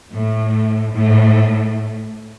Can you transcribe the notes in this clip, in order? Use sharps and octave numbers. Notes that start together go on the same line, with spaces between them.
A2
A2